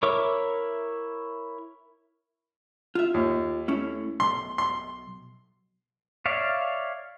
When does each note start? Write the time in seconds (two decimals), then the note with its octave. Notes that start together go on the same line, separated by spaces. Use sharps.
0.03 E4 A#4 C#5 E5 D6
2.95 F4 E5
3.14 D#2
3.68 A3 C#4 E4
4.20 B1 C6
4.58 C6
6.26 C#5 D5 E5 F5